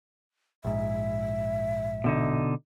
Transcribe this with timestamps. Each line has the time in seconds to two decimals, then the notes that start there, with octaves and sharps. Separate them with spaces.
0.65 A#1 G#2 E5
2.04 B2 D3 D#4